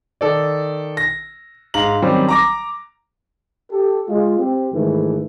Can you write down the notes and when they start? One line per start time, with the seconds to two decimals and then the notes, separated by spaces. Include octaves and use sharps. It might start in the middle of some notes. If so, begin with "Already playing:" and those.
0.21 D#3 A4 D5
0.97 A#6
1.74 G#2 F5 A#5 F#7
2.02 D#3 F#3 G3 C4 C#4
2.29 A#5 D6 A#6
3.71 G4 A4
4.08 G#3 F4
4.38 C4 G4
4.73 G#2 D#3 E3 A3